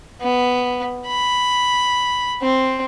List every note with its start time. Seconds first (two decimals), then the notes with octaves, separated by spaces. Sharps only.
0.21 B3
1.07 B5
2.42 C4